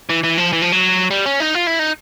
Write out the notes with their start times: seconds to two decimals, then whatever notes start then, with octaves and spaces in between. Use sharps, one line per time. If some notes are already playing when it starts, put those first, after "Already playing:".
0.09 E3
0.24 E3
0.38 F3
0.53 E3
0.62 F3
0.72 F#3
1.11 G3
1.26 C#4
1.40 D#4
1.55 F4
1.67 E4
1.79 D#4